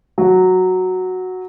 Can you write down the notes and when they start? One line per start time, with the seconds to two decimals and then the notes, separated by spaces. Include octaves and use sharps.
0.18 F#3